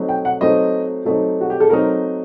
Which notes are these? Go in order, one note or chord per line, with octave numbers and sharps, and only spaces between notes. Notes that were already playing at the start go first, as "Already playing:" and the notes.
Already playing: F#3 A3 C4 D#4
G5
F#5
F#3 A3 C4 D#4 D#5
F#3 A3 C4 D#4
F#4
G4
A4
F#3 A3 C4 D#4 A#4